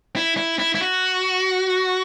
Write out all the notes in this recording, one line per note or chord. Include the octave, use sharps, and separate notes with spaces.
E4
E4
E4
E4
F#4